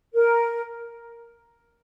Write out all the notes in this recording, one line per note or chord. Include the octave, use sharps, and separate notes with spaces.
A#4